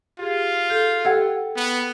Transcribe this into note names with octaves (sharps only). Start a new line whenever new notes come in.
F4 G4 G#4
A4 G6
G4 A4 F#5 E6 G#6
B3